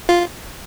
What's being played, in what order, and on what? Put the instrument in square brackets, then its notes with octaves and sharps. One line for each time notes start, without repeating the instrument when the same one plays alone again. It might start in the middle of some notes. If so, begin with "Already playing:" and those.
[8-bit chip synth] F4